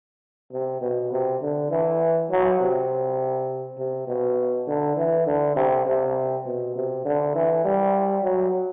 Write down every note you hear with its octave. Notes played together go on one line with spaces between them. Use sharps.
C3
B2
C3
D3
E3
F#3
C3
C3
B2
D3
E3
D3
C3
C3
B2
C3
D3
E3
G3
F#3